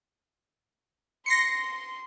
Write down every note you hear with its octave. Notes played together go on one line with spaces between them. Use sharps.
C6 A#6 C7 C#7